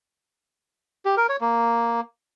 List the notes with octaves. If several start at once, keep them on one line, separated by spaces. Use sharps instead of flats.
G4
A#4
C#5
A#3